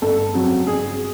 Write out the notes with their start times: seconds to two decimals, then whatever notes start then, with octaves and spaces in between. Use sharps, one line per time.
0.02 G1 A4
0.34 F2 C#3 F#3
0.66 G1 G#4